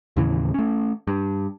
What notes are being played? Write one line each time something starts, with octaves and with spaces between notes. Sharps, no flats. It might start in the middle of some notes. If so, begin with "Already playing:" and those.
D#2 A2 C#3 E3
A3 C#4
G2